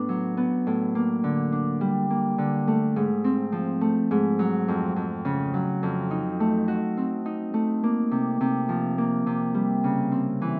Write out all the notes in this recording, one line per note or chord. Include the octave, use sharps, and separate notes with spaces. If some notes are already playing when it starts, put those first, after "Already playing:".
Already playing: A2 B3 D4
F#3
B3
A2
A#3
D3
D4
G3
A#3
D3
A3
G#2
C4
F3
A3
G#2
F#3
F2
F2
C#3
F#3
F2
D#4
A3
F#4
C4
D#4
A3
A#3
C3
C3
F3
A#3
C3
G3
C#3
C4
E3